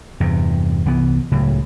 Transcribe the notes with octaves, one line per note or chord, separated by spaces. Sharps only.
E2 G2 C3
C2 E3 B3
C#2 A2 C#3 F#3